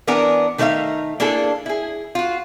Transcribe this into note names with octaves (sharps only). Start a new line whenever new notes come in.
E3 B3 D4 A#4 G#5 A#5
D#3 A3 D#4 C5 E5 F5
A#3 D4 E4 G#4 A4
E4 G#4
F4 F#4